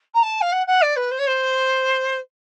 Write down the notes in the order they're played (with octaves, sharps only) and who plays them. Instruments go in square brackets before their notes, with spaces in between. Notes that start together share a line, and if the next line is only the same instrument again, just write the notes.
[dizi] A#5
A5
F5
F#5
F#5
D5
B4
C5
C#5
C5